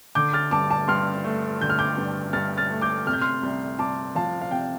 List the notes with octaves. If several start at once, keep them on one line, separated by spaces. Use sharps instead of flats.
D3 D6 G6
F6 A6
G2 A5 D6
A5 D6
G2 C6 F6
A3
D3 G6
F6
D6 G6
G2
G2 F6 A6
F6 A6
A3
D6 G6
C3 F6
G6
C6 F6
C2
C2 A5 D6
F3 F5 A5
F5
C3 G5